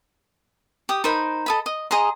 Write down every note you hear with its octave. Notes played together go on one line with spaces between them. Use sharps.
G4 D#6
D#4 A#4 C5 B5
A4 D#5 B5
D#5
G#4 D#5 A#5 C6